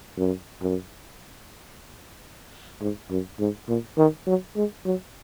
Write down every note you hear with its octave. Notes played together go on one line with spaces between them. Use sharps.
F#2
F#2
G#2
F#2
G#2
A#2
D#3
F#3
G#3
F#3